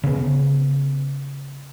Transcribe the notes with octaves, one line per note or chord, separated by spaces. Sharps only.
C#3 B3